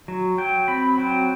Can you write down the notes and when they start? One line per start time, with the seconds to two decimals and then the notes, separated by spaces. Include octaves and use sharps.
0.08 F#3
0.38 F#3 G5
0.68 C4 B5
0.98 F#3 G5